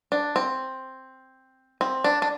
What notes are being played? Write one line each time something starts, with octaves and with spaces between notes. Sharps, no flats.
D4
C4
C4
D4
D4